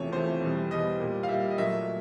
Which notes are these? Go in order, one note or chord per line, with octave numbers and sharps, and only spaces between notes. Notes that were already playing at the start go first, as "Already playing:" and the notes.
Already playing: E2 C3 F3 A3 C#5
E2 C3 F3 A3 C5
E2 B2 G3
E2 B2 G3 D#5
A#2 G3
F5
A#2 G3 E5
D#5
A#2 F#3 A3 E5